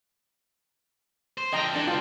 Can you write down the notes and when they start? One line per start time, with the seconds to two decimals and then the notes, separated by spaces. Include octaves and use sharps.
1.38 C5
1.53 D3 F3 D#5 G5 A#5
1.74 E3 D4 A5
1.87 C#2 D3 F4 G5